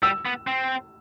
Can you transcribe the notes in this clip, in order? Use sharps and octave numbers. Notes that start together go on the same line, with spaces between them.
G3 E6
B3
C4